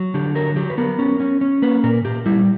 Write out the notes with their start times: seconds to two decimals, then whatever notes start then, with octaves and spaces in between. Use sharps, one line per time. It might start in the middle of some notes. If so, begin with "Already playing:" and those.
Already playing: F#3
0.14 D3 G4
0.35 F#3 A#4
0.56 F#3 G4
0.70 B4
0.78 B3 A#4
0.99 C#4
1.20 C#4
1.41 C#4
1.62 A#3 B4
1.84 A#2 A#4
2.05 A#2 G4
2.26 G3 E4